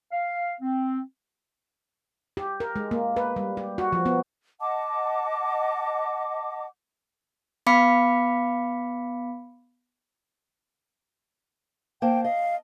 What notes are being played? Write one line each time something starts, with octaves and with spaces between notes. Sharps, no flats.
F5
C4
G4
A#4
G#3
A#3
B4
G3
G4
F#4
F3
B3
D#5 F#5 A5 D6
B3 F5 B5 D6 B6 C#7
A#3 C5 G5 A5
D#5 F5